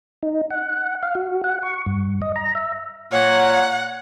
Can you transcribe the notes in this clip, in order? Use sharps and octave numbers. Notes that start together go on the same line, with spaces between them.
D#4
F#5
F5
F#4
F#5
C#6
G2
D#5
A#5
E5
A#2 A#3 C#5 F#5